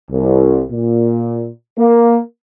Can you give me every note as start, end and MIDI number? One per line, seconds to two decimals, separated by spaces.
0.11 0.64 36
0.70 1.49 46
1.78 2.18 58